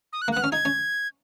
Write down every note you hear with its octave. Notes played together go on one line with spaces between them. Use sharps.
D#6
F#6
A#3
F#6
B3
C#4 F6
D#4 G#6
C#4